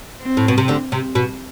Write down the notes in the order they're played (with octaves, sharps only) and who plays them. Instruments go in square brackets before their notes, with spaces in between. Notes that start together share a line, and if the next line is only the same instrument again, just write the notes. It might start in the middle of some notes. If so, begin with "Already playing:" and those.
[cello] C4
[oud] A2
B2
C3
D2 D3
C3
B2